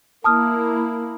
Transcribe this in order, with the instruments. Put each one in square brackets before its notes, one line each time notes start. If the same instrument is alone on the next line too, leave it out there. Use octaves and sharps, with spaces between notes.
[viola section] A#3 E4 [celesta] A5 D#6 F6